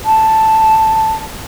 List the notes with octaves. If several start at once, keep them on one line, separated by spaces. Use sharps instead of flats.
A5